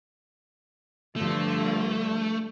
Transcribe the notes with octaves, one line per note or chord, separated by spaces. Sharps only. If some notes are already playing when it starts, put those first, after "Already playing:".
G2 D3 F3 A3